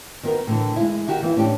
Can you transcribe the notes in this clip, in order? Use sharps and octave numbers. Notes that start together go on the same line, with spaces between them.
D#3 B3 F#4 A#4
A2 D3 E3
G#3 E4
D#3 F#4 G4
E3 B3 E4
A2 C#4 D4 G4